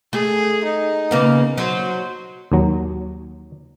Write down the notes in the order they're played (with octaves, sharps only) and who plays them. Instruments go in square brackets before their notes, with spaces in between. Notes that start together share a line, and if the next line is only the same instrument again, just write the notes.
[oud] A3 [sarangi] G#4
[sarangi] D#4
[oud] C#3 A#3 B3
[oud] F#3 [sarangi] C5
[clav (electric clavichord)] D#2 F#3